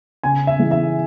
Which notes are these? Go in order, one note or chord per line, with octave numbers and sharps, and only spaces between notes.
C#3 G#5
E5
E3 G#3
E5